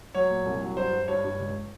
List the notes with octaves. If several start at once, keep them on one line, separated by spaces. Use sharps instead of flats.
F#3 C#5
A#2
C2
F#3
G2 C5
G2
G2 C#5
G2
C#2